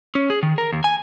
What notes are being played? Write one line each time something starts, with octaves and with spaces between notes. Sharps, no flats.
C#4
G#4
D#3
A#4
D#2
G#5